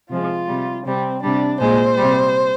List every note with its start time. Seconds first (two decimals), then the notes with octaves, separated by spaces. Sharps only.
0.09 C3 F3 G#3 F4
0.47 C3 G3
0.85 C3 G3 C4
1.22 C3 G3 D4
1.59 A#2 G#3 C5
1.97 C3 G3